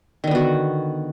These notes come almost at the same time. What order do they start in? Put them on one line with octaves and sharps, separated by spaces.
D#3 D3 B3 F#4